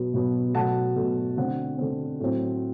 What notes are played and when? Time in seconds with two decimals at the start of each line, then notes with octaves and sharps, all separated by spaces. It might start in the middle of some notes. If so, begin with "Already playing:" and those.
Already playing: B2 F#3 B3
0.14 B2 F#3 B3
0.54 B2 F#3 A3 F#5 A5
0.96 B2 F#3 A3
1.37 D3 A3 C4 F#5
1.78 D3 A3 C4
2.20 A2 F#3 C4